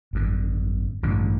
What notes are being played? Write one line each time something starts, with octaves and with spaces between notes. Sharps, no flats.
G#1 F#2 D3
A1 G2 D3